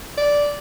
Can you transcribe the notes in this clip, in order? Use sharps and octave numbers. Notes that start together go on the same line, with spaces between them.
D5